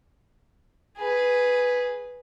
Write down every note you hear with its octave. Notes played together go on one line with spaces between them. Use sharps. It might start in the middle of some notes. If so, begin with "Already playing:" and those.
G#4 B4